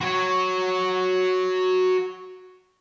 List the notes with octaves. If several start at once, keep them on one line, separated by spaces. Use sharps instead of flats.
F#4 C#5